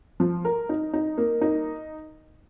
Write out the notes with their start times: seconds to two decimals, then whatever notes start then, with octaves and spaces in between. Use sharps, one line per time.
0.20 F3
0.45 A#4
0.69 D#4
0.93 D#4
1.18 A#3
1.41 D#4